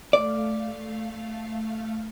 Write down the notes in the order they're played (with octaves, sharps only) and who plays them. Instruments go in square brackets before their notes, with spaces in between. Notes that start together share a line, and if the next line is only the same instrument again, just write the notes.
[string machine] A3 F5 [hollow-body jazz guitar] D5